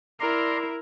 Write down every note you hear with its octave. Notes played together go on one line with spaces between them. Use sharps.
E4 A#4 D5 A#5 C6